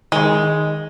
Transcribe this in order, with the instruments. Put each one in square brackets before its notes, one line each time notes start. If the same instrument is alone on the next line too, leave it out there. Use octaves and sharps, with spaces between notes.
[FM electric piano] D#3 [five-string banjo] G#3